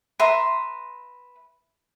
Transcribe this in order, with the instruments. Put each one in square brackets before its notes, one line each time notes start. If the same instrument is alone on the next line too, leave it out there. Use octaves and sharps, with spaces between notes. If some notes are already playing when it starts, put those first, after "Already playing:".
[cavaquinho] B4 E5 A#5 C6